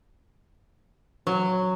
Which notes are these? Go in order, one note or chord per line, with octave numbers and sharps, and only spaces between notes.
F#3